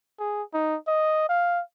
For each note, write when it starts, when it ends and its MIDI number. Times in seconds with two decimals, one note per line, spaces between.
0.19 0.42 68
0.53 0.76 63
0.88 1.29 75
1.29 1.61 77